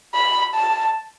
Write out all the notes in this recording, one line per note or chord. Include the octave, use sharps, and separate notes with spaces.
B5
A5